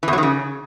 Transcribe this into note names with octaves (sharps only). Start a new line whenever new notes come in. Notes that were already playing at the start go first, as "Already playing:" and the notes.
E3
E2
F#3
D#3
C#3